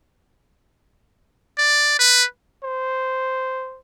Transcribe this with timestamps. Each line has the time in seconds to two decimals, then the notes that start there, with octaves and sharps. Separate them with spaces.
1.58 D5
1.99 B4
2.63 C5